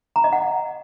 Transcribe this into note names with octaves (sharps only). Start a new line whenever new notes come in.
A#5
D#5
F#5